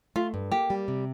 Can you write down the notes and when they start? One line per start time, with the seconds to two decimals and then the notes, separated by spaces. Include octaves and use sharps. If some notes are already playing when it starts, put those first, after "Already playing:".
0.16 A3 F4
0.34 G2
0.51 A#3 G4
0.70 G3
0.88 C3